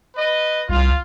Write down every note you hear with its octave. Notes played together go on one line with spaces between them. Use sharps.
B4 D#5
C2 F4